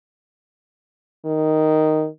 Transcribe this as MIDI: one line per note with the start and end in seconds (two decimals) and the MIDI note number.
1.25 2.06 51